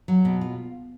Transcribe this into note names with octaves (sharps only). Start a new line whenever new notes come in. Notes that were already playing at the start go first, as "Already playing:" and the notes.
F#3
B2
F4